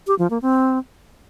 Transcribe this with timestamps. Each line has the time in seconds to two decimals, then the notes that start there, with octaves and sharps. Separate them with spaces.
0.07 G4
0.19 F3
0.30 A#3
0.42 C4